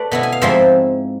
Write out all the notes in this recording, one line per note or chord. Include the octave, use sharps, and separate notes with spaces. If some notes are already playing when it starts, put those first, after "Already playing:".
Already playing: A3 B4 D5
B2 B3 E4
G#5
F5
G#2 F3 G#3 C4 E4 C5 E5